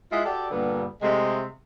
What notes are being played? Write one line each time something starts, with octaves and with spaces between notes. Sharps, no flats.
G#3 E4 F4 D#5 F#5
F#4 G4 A4 D5
G2 A#2 D3 G3 A#3 B3
C3 G#3 A3